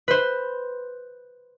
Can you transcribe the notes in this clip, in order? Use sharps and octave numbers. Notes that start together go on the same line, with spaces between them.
B4 C5